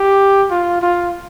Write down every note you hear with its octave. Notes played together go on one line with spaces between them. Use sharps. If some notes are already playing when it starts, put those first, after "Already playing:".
Already playing: G4
F4
F4